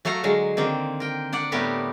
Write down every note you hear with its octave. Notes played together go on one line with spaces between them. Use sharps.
F#3 A3 A4 F5 A#5
D3 F#3 G#3
D3 D#3 A#3 C4
A#4 G5
D4 D5 F#5
A2 G3 A3 B3 G4 A#4